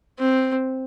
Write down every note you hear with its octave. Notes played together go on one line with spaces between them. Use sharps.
C4